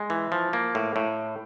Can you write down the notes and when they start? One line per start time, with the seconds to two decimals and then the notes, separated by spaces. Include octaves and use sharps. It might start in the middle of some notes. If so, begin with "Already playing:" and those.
Already playing: G#3
0.10 E3
0.32 F3
0.53 A#3
0.75 A2
0.96 A2